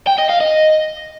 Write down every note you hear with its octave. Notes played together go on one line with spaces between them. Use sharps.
G5
D#5
F5
D#5